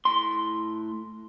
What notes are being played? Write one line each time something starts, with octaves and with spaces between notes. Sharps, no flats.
A2 C6